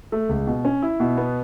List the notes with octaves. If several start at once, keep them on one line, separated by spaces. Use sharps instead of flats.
A3
C#2
B2
C#4
E4
B2
B3